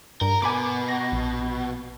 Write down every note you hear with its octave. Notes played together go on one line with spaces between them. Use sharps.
G2 A#4
B2 G#5 B5 D6
A#6
A#1